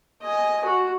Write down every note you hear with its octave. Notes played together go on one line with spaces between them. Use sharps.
D#5 G#5
F#4